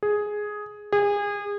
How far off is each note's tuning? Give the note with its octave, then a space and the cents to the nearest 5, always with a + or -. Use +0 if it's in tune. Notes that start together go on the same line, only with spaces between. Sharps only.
G#4 +5
G#4 -30